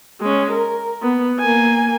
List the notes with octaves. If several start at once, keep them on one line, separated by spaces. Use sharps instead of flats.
G#3 C#4
A#4
B3
A#3 G#5